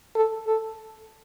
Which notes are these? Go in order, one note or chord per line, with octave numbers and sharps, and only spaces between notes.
A4
A4